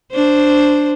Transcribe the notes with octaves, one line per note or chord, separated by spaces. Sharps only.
D4 C5